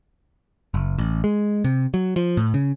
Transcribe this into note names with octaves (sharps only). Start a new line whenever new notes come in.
F#1
A1
G#3
C3
F#3
F3
A2
C#3